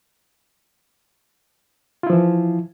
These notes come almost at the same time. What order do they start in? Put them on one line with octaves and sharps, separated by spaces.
F4 E4 F3 E3